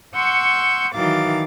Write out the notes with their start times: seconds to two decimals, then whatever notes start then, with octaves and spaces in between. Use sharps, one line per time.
0.14 F#5 C6 C#6 E6 G6
0.92 D#3 E3 F#3 F5 D6 A6